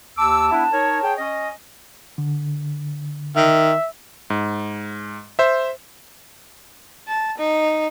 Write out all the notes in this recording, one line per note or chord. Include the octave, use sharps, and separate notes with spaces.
D#2 A5 D6 E6
B3 D4 E4
D#4 A#4 C#5
G#4 C#5 G5
C#4 D#5
D3
D#3 E5
G#2
C5 E5
A5
D#4